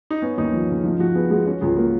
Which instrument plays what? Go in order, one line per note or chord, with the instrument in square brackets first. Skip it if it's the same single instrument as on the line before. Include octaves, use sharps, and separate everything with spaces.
[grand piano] D#4
[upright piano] B3 [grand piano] C#4
[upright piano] D#2 [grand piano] D#4
[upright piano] F3
C#3
[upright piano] F3 [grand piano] D#4
[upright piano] F3 [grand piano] F#4
[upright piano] B3 [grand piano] G#4
[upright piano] G#3 [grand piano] F#4
[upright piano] C#4 [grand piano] F#4
[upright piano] C#2 [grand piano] G#4
[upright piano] A#3 [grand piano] F#4